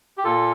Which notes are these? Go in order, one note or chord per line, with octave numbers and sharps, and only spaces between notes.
G4
A#2 F4 A4